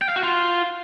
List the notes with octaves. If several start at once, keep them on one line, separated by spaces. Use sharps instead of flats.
G5
F5
F#4
F4